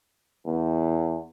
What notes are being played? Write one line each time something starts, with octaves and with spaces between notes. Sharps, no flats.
E2